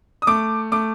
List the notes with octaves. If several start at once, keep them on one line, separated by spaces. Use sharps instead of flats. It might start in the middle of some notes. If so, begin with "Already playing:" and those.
D#6
A3 D6
A3 D6